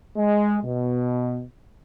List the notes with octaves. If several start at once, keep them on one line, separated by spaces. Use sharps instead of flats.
G#3
B2